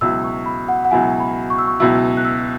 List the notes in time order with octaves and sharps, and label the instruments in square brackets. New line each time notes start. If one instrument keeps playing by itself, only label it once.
[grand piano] C#2 B2 F#3 E4 [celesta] E6
[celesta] C#6
B5
F#5
F#5
[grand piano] C#2 B2 F#3 E4 [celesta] G#5
[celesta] B5
C#6
E6
C#6
[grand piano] C#2 B2 F#3 E4 [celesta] E6
[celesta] F#6
E6